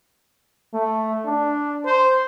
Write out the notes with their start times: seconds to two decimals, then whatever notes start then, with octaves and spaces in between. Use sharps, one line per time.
0.73 A3
1.25 D4
1.85 C5